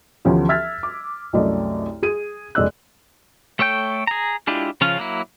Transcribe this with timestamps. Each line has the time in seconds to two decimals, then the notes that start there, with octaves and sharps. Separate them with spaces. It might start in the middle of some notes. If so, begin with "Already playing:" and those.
0.25 D2 E3 F3 B3 C#4 G4
0.49 E5 E6 F6 G#6 A6 B6
0.83 D6
1.33 C2 F#2 A3 D5 D#5
2.03 G#4 D#7
2.55 F1 G#3 D5 D#5 E6 F#6
3.59 A3 A4 C#5 G5 G6
4.07 G#4 A#5
4.47 G#3 D4 E4 F4 G4
4.81 C#3 F3 C#4 F4 F5
4.98 F#3 A#3 E4